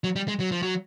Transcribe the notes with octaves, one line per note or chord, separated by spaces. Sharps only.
F#3
G3
G#3
F#3
F3
F#3